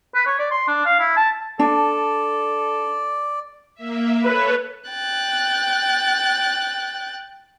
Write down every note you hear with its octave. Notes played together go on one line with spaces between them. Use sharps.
B4
C#5
D5
C6
D4
F5
E4
A5
D4 A4 D5
A#3 E5
A4 B4 C#5
G5 F#6 A6